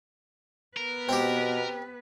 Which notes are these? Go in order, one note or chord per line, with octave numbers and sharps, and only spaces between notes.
B3 A#4 B4
B2 C4 G4